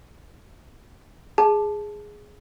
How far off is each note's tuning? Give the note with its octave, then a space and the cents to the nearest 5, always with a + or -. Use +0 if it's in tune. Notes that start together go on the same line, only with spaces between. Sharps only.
G#4 +0 A5 -15